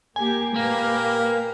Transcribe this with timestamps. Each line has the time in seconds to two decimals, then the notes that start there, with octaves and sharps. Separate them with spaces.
0.16 A#3 G4 G#5
0.56 A#2 A#3 G4 A#4 B4